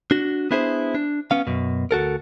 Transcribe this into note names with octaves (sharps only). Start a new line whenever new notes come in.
D4 F#4
B3 D4 E4 G#4 A#4 C5
D4
B3 C#4 F5
F#2 B2
D2 F#4 A4 A#4